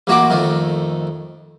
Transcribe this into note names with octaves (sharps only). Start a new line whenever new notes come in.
A1 A#3 F#4 B5 D6
F2 D#3 A3